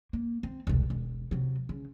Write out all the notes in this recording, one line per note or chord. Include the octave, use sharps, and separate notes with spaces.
A#3
C4
E1 C2
E1
C3 F#3
C#3